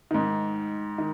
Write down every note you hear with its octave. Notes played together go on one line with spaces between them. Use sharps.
G#2 D#3
D#3